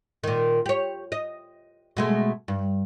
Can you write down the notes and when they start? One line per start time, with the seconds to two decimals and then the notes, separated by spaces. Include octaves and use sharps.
0.24 A#2 D#3
0.66 G4 C#5
1.12 D#5
1.97 B2 G#3 A3
2.48 G2